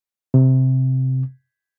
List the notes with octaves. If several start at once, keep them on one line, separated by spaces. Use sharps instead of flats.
C3